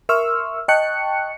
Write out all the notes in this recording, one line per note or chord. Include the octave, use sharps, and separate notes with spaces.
A#4 E5 C6 C#6 E6 F6
D#5 G5 A5 C#6 F#6 C#7